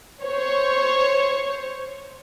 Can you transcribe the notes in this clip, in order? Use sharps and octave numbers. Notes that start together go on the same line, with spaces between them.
C5 C#5